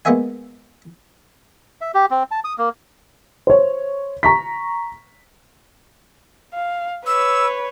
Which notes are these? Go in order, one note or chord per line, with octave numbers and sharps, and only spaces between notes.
G#3 A#3 B3 C#5 E5 G#5
E5
G4
C4
A5
D#6
A#3
C5 C#5
A#5 C#6 B6
F5
B4 C#5 E6